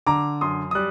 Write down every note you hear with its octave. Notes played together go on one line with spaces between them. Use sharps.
D3 A#5 D6
F#2 C6 D#6
D#6
G3 F#6